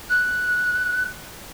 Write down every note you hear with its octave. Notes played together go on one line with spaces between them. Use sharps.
F#6